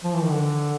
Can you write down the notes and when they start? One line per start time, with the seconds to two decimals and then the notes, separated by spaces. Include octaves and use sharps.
0.04 F3
0.14 E3
0.23 D#3
0.31 D3